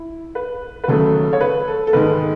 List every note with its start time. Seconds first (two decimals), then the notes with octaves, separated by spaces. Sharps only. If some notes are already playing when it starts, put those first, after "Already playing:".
Already playing: E4
0.35 B4
0.84 B4
0.88 D#2 C#3 F#3 A3 A4
1.33 C#5
1.41 B4
1.68 A4
1.87 A4
1.93 G#2 D#3 G#3 B4